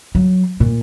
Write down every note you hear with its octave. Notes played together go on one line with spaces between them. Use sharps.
F#3
A#2